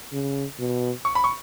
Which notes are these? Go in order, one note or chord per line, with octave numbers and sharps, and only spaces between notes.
C#3
B2
C#6
B5
C#6